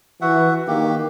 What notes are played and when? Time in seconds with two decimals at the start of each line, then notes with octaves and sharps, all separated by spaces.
0.21 E3 F#4 E5 F#5
0.67 D#3 A#3 G4